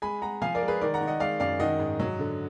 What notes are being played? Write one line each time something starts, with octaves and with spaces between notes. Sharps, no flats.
G#3 G#5 B5
G#3 F#5 A#5
F3 F5 G#5
A#4 D5
G#3
G#4 B4
D#3 A#4 D5
F#5 A#5
D#3
D#5 F#5
G#3 D5 F5
F#2 D5 F5
D#3 D#5 F#5
G#2
F#3
D3